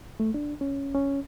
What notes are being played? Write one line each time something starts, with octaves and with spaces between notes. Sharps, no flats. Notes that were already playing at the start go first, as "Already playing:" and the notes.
A3
D4
C#4
C#4